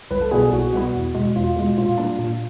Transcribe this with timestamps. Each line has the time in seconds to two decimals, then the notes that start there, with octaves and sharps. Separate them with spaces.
0.11 C2 B4
0.21 A4
0.31 B2 G3 B3 E4 G#4
0.52 C2 F#4
0.73 B2 G3 B3 E4
0.94 E2
1.15 B2 G#3
1.36 E2 F4
1.56 B2 G#3
1.77 A#2 F4
1.98 G3 A#3 D4
2.19 A#2